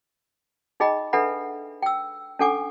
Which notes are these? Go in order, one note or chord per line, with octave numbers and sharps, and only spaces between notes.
D#4 G#4 D#5 G5 B5
D4 A4 B4 E5 F#5 B5
G5 E6
C#4 D4 A4 F#5 G#5 D6